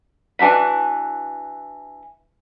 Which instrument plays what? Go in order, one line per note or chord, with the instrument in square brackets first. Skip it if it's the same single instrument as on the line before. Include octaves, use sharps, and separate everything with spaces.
[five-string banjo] E3 D4 F#4 B5